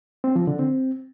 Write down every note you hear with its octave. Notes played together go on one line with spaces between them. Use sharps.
C4
F3
D3
C4